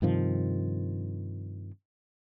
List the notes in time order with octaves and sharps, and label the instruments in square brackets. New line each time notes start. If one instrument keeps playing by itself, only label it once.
[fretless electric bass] G2 C3 D#3 F3